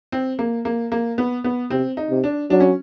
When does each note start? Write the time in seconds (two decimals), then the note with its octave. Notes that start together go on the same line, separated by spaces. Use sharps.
0.12 C4
0.39 A#3
0.65 A#3
0.92 A#3
1.18 B3
1.44 B3
1.71 C3 C4
1.97 D#4
2.10 C3
2.24 D4
2.50 F#3 D4
2.60 C#4